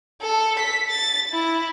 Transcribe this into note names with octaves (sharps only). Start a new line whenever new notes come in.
A4
B6
A6
E4